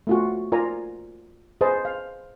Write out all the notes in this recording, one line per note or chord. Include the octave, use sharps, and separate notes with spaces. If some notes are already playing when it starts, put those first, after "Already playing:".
A3 F4 F#4
F4 A#4 D5 G#5 A#5
G#4 B4 C5 D#5 A5
F5